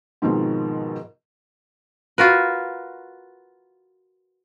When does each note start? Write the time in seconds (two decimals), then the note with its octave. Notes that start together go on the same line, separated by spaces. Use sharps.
0.22 G#2 B2 D#3 F3 C4
2.18 F4 F#4 A#4 B4